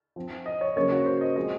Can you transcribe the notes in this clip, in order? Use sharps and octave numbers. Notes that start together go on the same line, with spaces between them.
F3 C4
D#5
C#5
C#3 F#3 A#3 C#5
F#4
C5
D#5
F3 G#3 C4 D#5